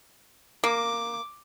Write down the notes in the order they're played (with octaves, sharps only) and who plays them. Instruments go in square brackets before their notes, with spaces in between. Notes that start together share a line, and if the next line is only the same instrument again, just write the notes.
[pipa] A#3 [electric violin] D6